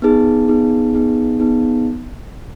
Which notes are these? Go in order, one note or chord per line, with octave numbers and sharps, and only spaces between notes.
B3 D#4 G#4
B3 D#4 G#4
B3 D#4 G#4
B3 D#4 G#4